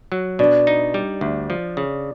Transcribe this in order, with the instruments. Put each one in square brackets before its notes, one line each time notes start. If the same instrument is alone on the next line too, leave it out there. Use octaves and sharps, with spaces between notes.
[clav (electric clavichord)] F#3
[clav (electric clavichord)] B2 [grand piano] D4
[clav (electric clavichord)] D#4
G3
D2
F3
C#3